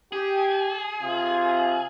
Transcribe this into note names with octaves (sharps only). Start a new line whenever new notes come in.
G4 G#4
C3 F4